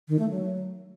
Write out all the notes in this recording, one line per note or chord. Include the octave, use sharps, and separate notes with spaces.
D#3
A3
F#3